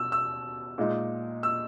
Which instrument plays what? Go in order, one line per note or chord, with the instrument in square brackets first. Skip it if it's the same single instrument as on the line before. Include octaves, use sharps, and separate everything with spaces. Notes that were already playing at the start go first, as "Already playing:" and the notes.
Already playing: [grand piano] B2 E6
E6
A#2 G#3 D#4
E6